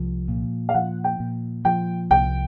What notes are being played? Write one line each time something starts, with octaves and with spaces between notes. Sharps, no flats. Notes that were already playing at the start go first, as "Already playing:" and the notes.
Already playing: C2 F3
A#2
F5
F3 F#5
G5
A#2
F3 G5
C2 G5